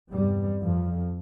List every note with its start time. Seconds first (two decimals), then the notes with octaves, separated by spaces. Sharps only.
0.10 E2 G2 C3 G3
0.62 F2 F3